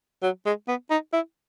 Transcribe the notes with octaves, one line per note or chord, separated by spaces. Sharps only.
F#3
G#3
B3
D#4
E4